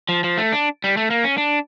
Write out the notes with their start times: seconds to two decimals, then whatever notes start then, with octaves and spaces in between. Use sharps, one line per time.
0.09 F3
0.24 F3
0.37 A3
0.53 D4
0.84 G3
0.97 A3
1.10 A#3
1.24 C#4
1.38 D4